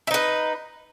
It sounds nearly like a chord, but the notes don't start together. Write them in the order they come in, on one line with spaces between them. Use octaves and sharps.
E4 D#4 B4